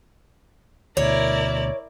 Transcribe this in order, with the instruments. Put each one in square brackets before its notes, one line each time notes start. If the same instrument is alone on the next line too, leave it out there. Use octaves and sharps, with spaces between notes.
[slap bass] D2 B2 [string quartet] E4 A#4 D5 [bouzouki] C#5